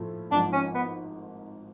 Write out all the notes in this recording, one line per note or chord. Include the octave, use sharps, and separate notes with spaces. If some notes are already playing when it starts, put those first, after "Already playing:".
Already playing: A2 F3 A3 F4
G#1 G#2 F3 D4
C#4
B3